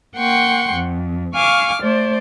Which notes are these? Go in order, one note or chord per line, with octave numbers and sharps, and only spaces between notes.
A#3 F#5 G5 C6 C#6
F2
F5 G#5 C#6 D6 F6
A3 C5 D5